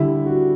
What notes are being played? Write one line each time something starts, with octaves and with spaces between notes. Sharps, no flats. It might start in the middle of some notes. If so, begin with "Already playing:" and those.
Already playing: D3 G3 E4
F#4